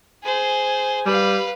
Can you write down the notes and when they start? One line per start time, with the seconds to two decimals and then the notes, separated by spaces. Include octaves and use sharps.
0.23 G#4 C5
1.06 G3 B4 F5